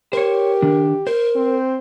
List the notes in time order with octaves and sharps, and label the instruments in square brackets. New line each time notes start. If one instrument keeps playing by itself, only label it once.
[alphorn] G4 [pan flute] A#4 [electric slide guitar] C5 C#5
[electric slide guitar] D#3 D4
[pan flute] A#4 [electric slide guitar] C5
[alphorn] C4